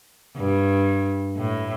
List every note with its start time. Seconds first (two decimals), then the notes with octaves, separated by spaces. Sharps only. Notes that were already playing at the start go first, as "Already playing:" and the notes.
0.37 G2
1.36 A2